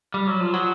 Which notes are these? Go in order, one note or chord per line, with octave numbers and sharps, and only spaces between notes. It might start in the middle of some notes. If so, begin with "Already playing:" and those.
G3
F#3
F3
F#3